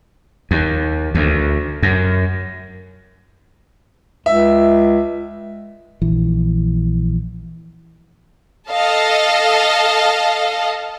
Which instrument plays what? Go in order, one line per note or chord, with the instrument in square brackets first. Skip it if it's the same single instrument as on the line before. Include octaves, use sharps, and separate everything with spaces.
[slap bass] D#2
D2
F#2
[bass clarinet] C#2 [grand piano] E5
[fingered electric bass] A#1 E3
[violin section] A4 D#5 F5 A5